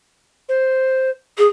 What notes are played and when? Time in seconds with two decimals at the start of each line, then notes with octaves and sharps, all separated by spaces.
0.49 C5
1.38 G#4